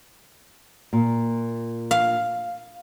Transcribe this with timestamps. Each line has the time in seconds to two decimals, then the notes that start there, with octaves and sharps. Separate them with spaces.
0.93 A#2
1.91 F5